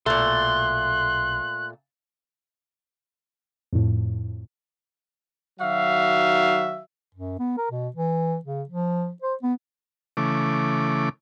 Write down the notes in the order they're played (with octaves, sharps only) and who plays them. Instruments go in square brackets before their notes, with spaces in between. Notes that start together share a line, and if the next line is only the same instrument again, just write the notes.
[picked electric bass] B1 [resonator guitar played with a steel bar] A#2 A3 [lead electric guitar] C6 [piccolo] F#6
[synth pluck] F2 A2
[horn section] D#3 F#3 F#4 E5 F5
[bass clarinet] F#2
B3
A#4
B2
E3
C#3
F3
C5
B3
[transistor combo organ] C#3 E3 A3 D6